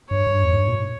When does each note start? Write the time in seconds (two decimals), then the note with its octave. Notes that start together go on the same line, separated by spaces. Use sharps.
0.10 G2 C#5
0.27 G2
0.43 E2
0.53 G#2
0.59 G2
0.68 A#2